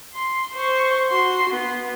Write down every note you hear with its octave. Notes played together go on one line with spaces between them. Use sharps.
C6
C5 C#6
F#4 C6
B3